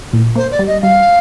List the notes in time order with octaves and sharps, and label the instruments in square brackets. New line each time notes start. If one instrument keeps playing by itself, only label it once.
[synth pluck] A#2
[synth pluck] A#3 [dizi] C5
[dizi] D5
[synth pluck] G3
[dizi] D#5
[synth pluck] G3 [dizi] F5